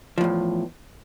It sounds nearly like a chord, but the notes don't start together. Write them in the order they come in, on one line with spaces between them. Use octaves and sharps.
F3 A2 E2